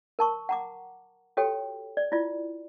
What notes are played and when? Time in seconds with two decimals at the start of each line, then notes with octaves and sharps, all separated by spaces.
0.19 A#4 A5 C#6
0.49 F#5 A#5 D6
1.37 F#4 G4 A4 C#5 G5
1.97 D5
2.12 E4 F4 D5